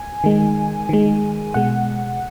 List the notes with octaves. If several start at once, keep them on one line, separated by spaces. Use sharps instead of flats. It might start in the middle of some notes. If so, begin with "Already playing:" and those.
Already playing: G#5
D#3 G#3
D#3 G#3
B2 G#3 F#5